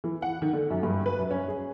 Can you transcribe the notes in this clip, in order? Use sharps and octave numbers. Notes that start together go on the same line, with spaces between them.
E3
F#5
D#3
D3
F#2
G2
B4
F#2
C#4
G#4